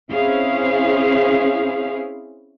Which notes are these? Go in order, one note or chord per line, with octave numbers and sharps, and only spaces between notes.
C4 C#4 E4 G#4 C5 F5